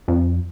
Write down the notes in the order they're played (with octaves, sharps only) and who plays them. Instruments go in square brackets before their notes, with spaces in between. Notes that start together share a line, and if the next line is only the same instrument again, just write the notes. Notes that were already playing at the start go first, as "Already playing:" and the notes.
[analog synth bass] F2